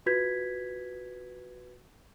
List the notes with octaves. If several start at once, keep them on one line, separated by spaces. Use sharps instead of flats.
F4 F#4 B4 G6 G#6 B6